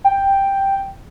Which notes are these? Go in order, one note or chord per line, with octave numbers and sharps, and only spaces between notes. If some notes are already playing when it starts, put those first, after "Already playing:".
G5